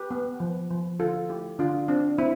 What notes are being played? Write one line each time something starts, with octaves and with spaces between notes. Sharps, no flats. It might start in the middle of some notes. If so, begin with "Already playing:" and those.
Already playing: G4 B4
B3
F3
F3
D3 F4 A4
A3 E4 G4
D3 D4 F4
C4 D4
C4 E4